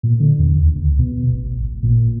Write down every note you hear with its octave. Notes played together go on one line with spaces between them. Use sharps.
A#2
D3
E2
D#2
C#2
B2
A1
A1
A#2